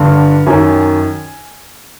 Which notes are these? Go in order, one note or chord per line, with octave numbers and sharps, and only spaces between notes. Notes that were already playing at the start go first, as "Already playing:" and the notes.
Already playing: G2 D3
F#2 D#3 G#5